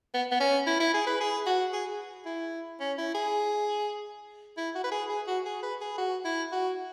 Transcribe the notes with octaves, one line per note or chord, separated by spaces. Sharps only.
B3
B3
C#4
E4
E4
G#4
B4
G#4
F#4
G#4
E4
C#4
E4
G#4
E4
F#4
B4
G#4
G#4
F#4
G#4
B4
G#4
F#4
E4
F#4